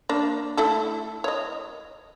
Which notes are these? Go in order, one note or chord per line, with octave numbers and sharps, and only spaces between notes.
A#3 D4
A3 E4 A4
C#5 D#5